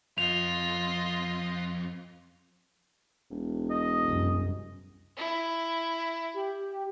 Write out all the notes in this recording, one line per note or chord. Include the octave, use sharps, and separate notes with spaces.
F2 F4 D#5 F7
E1
D#5
C2 F#2
E4
G4